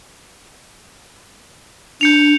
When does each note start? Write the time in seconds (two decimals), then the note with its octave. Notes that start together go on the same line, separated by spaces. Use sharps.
2.01 D4 G6 C#7 F7